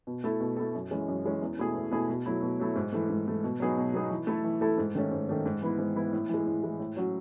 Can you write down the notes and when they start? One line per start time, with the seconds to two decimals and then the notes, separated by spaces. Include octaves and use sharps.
0.07 B2
0.24 A3 E4 A4
0.40 B2
0.57 A3 E4 A4
0.75 F#2
0.91 E3 G#3 C#4
1.08 F#2
1.25 E3 G#3 C#4
1.42 E2
1.59 B2 A3 E4 G#4
1.75 E2
1.91 B2 A3 E4 G#4
2.09 B2
2.26 F#3 A3 E4
2.42 B2
2.59 F#3 A3 E4
2.76 G#2
2.93 E3 A3
3.09 G#2
3.26 E3 A3
3.44 B2
3.60 F#3 B3 D#4 G#4
3.77 B2
3.94 F#3 B3 D#4 G#4
4.10 E3
4.27 A3 E4 A4
4.44 E3
4.61 A3 E4 A4
4.78 G#2
4.95 D#3 A3 C#4
5.11 G#2
5.29 D#3 A3 C#4
5.46 G#2
5.62 E3 B3 E4
5.79 G#2
5.95 E3 B3 E4
6.13 A2
6.29 E3 G#3
6.47 A2
6.63 E3 G#3
6.80 A2
6.96 F#3 C#4 F#4